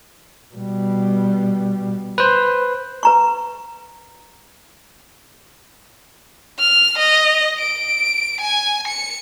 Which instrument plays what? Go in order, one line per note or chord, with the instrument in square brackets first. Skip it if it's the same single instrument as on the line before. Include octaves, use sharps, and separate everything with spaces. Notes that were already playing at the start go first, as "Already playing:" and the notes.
[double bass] B2 G3
[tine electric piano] B4 C5
[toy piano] B4 A#5 C#6
[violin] F6
D#5
D7
G#5
C#7